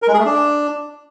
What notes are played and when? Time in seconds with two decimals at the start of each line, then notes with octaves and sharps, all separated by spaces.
0.02 A#4
0.08 G#3
0.14 G#4
0.20 A3
0.25 D4